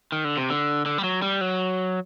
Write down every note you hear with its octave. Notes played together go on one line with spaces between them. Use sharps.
D#3
D3
C3
D3
D3
G3
F#3
G3
F#3